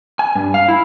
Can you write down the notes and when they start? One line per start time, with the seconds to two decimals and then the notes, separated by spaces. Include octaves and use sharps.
0.19 G#5
0.35 G2
0.54 F5
0.68 E4